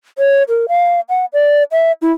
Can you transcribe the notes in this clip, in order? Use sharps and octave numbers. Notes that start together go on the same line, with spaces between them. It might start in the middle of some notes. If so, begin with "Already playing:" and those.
C#5
A#4
F5
F#5
D5
E5
E4